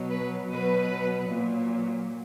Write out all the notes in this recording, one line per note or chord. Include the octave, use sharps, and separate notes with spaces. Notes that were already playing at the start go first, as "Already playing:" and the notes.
Already playing: B2 F#3
B4
B2 F#3 B4
A#2 F#3